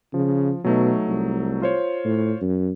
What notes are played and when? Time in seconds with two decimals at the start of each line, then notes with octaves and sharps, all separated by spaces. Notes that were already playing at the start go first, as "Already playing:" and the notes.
0.14 C#3 F3
0.64 B2 F#3 A3 D#4
1.08 C2
1.62 F4 C5 C#5
2.05 A2
2.42 F#2